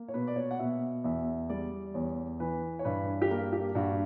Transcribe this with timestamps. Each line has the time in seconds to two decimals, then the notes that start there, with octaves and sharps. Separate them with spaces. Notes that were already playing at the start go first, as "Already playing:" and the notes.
Already playing: A#3
0.08 C#5
0.14 B2 B4
0.27 D5
0.36 C#5
0.51 F#5
0.59 B2 E5
1.04 E2 E5
1.49 G3 D5
1.94 E2 C#5
2.40 E3 B4
2.79 C#5
2.85 G2 B4
3.22 G4
3.30 A#3 A#4
3.53 G4
3.75 G2 F#4